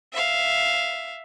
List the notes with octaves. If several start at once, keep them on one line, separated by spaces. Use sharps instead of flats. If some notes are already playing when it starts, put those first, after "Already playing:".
E5 F5